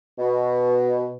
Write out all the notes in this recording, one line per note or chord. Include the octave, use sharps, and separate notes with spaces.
B2